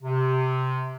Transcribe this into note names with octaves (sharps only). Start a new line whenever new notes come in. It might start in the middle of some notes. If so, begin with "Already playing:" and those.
C3